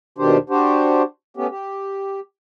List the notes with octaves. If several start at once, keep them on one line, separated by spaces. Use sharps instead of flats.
D#2 B2 D#3 D4 G4 C5
D4 F#4 G4 C5
A3 B3 C#4 G4
G4